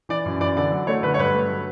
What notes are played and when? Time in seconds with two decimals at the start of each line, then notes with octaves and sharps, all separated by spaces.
0.09 E3 D5
0.26 F#2
0.41 E3 D5
0.57 D3 D5
0.72 F#3
0.87 A3 C#5
1.03 D3 B4
1.14 C#5
1.19 G2 B4
1.34 A3
1.50 F#3